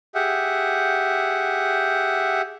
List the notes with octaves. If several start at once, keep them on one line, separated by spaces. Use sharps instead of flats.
G4 G#4 E5 F#5